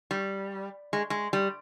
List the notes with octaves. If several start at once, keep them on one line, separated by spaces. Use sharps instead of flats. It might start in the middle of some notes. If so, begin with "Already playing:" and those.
G3
G#3
G#3
G3